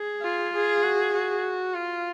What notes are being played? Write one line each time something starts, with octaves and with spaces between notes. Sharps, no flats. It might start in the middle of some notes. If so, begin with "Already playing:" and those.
Already playing: G#4
F4
G#4
F#4
F#4
F4